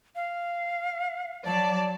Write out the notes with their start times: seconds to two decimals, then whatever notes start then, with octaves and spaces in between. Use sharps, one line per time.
0.15 F5
1.46 F#3 D5 A5